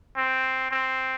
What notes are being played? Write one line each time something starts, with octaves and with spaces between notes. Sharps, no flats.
C4
C4